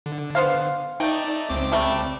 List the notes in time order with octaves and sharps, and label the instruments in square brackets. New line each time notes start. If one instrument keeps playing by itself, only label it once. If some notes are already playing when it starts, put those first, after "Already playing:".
[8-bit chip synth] D3
[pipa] B3 C5 F5
[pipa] A3 G5 [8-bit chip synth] D#4 D5
[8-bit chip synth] C#2 C4 D6
[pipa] C3 G3 A3